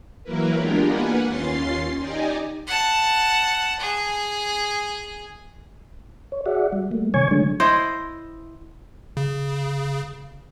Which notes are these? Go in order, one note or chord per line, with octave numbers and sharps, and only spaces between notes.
E3 F#3 A#3 E4 A#4 B4
G#3 B3 D4 F4 G4 A#4
A#3 B4 F#5 G#5
D#2 C#4 F4 C6 A6 C7
D#4 G4 D5 D#5 G#5
F#5 A5
G#4
C#5
F#4 G#4 D5 E5 F#5
G3
G3 A3 A#3
C3 D#3 C#5 G#5 C#6 G#6
D3 F#3 G#3 A3 D4
E4 C5 D#5
C#3